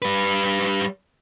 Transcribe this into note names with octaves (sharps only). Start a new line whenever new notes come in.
G3 B4